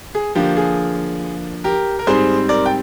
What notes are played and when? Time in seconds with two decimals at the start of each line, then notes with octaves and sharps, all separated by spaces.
0.15 G#4
0.35 D3 F3 A#3 G4
0.57 G#4
1.64 G4 A#4
1.99 A#4
2.07 G#2 G3 C4 G#4 C5
2.49 A#4 D5
2.66 G5